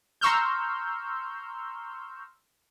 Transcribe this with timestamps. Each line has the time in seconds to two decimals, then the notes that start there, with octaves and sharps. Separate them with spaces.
0.21 A#5 C6 C#6 E6 F6 G6